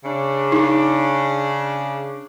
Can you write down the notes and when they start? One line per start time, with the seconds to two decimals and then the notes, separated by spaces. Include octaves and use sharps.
0.04 C#3 D4
0.52 D#4